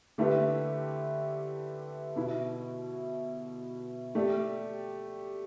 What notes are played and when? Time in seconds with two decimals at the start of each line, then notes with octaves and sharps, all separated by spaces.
0.18 D3 A3 E4 G4 B4
2.16 B2 B3 E4
4.15 A3 G4 D5